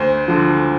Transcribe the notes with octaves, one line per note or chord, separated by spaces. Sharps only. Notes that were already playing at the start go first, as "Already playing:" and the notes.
Already playing: D2 C5
D3 F3